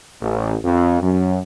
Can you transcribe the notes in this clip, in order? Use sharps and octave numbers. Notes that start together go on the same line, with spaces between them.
A1
F2
F#2